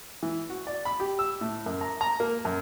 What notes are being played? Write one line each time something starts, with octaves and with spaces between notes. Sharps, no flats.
E3
F#4
D5
B5
G4
E6
A2
F#2
A#5
A#5
A#3
F#2